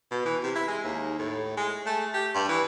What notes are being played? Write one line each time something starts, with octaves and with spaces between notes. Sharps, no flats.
B2
E3
C3
E4
G#3
D#2
A2
G#3
A3
G4
G2
E3